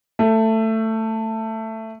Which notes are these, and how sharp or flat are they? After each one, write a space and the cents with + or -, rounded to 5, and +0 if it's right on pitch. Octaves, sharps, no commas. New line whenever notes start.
A3 +15